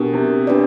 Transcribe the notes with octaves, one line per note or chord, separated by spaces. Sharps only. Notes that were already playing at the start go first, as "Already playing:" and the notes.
Already playing: B2 D4 G4 A#4
C3
D4 G4 B4 D5